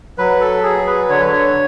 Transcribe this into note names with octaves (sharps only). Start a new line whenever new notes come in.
F#3 B4
A4
F#3 G#4
B4
D3 C#5
B4
C#5